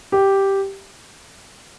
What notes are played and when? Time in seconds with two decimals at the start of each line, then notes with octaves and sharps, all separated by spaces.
0.12 G4